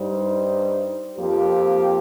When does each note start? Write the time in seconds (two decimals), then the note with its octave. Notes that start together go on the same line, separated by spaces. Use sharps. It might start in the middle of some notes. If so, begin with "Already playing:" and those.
Already playing: G2 G3 D#4 C5
1.18 F2 F3 A#3 G4